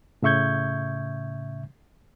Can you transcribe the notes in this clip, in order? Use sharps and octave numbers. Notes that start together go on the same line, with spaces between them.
A2 C#3 E5 C#6 G6 G#6